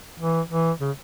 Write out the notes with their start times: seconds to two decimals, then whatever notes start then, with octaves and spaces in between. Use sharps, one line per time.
0.20 E3
0.50 E3
0.80 C#3